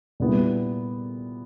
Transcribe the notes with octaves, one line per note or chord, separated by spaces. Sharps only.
A#2 G3 B3 E4